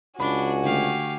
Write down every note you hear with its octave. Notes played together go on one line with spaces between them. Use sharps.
C#2 D4 F#4 G#5 B5
D3 A3 G4 F5